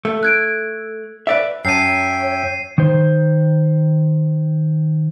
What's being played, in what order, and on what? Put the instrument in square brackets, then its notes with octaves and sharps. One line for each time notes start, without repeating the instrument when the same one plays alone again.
[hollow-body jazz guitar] A3
[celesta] F#6 G#6 D7
[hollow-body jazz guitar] B4 D5 E5
[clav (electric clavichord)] F#2 A5 [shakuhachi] C#5 [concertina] E5 G5 [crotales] C7 D#7
[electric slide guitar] D#3 C5